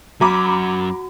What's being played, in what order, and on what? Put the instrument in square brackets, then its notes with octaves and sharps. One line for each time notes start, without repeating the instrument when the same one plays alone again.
[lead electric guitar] F#2 F#3 [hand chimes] F#4 [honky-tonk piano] A#5 B5 D6